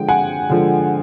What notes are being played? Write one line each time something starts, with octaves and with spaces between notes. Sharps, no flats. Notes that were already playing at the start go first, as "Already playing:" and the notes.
Already playing: D3 F3 G#3 G5
F#5 G#5
D3 F3 G#3